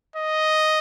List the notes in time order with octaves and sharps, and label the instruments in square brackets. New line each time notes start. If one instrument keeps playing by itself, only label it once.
[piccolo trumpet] D#5